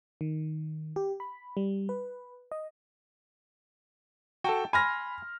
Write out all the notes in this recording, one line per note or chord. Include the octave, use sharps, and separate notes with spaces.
D#3
G4
B5
G3
B4
D#5
F#4 A4 G5 A5
G#5 B5 C6 F6 A#6